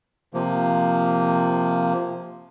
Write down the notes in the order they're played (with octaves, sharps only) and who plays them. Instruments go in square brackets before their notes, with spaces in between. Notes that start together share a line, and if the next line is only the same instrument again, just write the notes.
[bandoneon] C3 F3 A#3